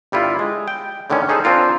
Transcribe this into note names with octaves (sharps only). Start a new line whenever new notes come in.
G1 G3 E4 F4
G#3
G5
A2 D3 D#3 A3 C#4
C#4 D#4 G#4 A4 C5
C4 D4 F4 A#4